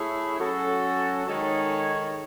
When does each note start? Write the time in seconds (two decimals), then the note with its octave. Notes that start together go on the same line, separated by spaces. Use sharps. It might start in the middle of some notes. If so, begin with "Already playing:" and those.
Already playing: A3 E4 G#4 C#5
0.38 F#3 C#4 F#4 A4
1.27 D#3 G#3 D#4 A4 C#5